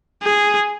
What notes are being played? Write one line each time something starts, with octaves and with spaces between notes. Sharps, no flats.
G#4